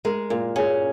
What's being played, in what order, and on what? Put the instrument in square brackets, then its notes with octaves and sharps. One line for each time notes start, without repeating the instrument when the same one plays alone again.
[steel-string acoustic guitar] G#3 [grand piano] A#4
[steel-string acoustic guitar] A#2 [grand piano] A#4
[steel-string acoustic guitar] C#4 [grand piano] G#4